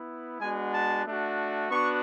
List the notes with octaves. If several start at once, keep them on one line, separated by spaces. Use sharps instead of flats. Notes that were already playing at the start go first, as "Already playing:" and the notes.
Already playing: B3 E4
G#3 B3 D4 F#4 G#5
A5
A3 D4 F#4
B3 D4 F#4 C#6